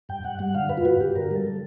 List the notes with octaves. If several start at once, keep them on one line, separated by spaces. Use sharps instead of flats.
G2 G5
G2 F#5
G3 F#5
D3 F5
G2 B4
F4
G2 F#4
G2 G4
D3 A#4
G3 A4
G3